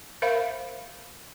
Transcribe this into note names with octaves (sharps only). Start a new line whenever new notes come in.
A#4 C5 E5 F5 B5